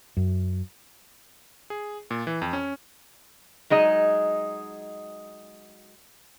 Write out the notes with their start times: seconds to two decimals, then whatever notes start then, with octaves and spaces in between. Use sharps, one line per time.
0.17 F#2
1.70 G#4
2.11 A#2
2.27 E3
2.42 F2
2.53 C#4
3.70 F#3 G#3 D#4 D#5